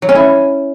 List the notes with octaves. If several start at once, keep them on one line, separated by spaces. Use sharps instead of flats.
F#3
C#4
E4